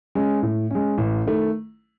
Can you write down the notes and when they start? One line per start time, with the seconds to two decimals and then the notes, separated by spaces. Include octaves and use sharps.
0.15 G#3 C#4
0.42 A2
0.71 G#3 C#4
0.98 A1
1.26 D#3 A3